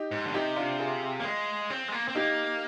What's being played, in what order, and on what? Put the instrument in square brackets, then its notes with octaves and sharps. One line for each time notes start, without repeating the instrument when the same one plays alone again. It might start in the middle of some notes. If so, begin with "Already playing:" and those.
Already playing: [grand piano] D#4 G4
[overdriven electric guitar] G#2
D3
[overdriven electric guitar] C3 [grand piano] D#4 G4
[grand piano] D4 F4
F4 G#4
[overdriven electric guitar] A#3
G#3
C4
G#3
A#3
C4
[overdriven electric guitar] A#3 [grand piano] D#4 G4